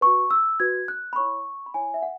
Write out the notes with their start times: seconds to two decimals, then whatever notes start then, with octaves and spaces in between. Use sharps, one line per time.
0.01 F#4 B4 C#6
0.31 E6
0.60 F#4 B4 G#6
0.88 F#6
1.13 B5
1.16 E4 C#5 C#6
1.66 B5
1.74 E4 C#5 G#5
1.94 E5
2.02 F#5